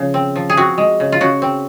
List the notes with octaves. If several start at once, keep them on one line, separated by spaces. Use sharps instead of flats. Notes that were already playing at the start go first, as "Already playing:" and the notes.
Already playing: C#3 F3
C4
F3
G#4
C4 F#4
G#3
C#3
F4
C#3 F#4
C4